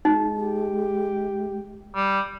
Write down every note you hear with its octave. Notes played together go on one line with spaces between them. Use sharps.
G#3 D#4
G4
G3